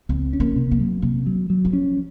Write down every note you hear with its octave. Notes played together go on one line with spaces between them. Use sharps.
C#2 C4
C#4
A#3
C3
A#3
F#3
C3 A#3
F#3
F#3
F3
C#4